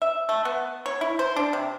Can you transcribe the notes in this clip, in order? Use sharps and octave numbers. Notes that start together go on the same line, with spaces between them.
E5
A3
B3
C#5
E4
C5
D4
C3